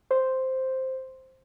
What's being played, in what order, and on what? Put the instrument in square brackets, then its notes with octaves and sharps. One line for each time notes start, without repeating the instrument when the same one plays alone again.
[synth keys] C5